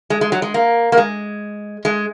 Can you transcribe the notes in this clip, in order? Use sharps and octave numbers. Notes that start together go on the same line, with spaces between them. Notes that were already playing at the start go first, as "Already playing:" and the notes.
G#3
G#3
F#3
G#3
A#3
A#3
G#3
G#3